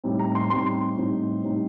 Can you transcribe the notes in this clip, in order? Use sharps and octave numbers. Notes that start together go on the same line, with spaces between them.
A2 G3 C4 D#4
A#5
C6
A2 G3 C4 D#4 C6
A2 G3 C4 D#4
A2 G3 C4 D#4